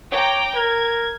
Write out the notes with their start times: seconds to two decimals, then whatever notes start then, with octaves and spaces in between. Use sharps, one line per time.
0.12 C#5 G5 A#5 D6
0.55 A#4 G#6